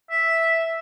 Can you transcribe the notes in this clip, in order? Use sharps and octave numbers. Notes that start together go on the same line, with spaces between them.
E5